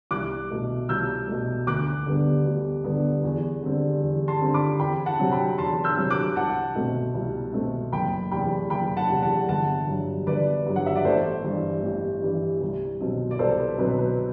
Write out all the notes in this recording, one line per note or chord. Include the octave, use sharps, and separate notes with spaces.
C2 D6 F#6
B2 A3
C2 E6 G6
B2 A3
D2 D6 F#6
D3 G3 B3
D2
D3 G3 B3
E2
D3 G3 C4
E2
A5 C6
D3 G3 C4
B5 D6
E2 G5 B5
F#5 A5
C3 F#3 C4
G5 B5
E2 A5 C6
E6 G6
C3 F#3 C4
D6 F#6
C2 F#5 A5
B2 A3 C4
C2
B2 A3 C4
F#1 G5 B5
E2 C3 G5 B5
F#1 G5 B5
F#5 A5
E2 C3
F#5 A5
G1 F#5 A5
G2 F#3
G1 B4 D5
G2 F#3
F#5
E5
D5
A1 A4 C5
G2 E3 G3
A1
G2 E3 G3
C2
B2 F#3 C4
D5
C2 A4 C5
B4
B2 F#3 C4 B4
B4